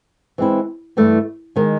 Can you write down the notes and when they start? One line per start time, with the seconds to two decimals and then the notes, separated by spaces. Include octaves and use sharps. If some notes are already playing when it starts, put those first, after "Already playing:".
0.38 E3 G#3 C4 E4
0.97 G2 E3 A3
1.56 D#3 G#3